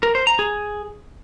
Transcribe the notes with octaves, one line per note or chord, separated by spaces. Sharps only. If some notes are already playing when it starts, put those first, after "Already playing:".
A#4
C5
A#5
G#4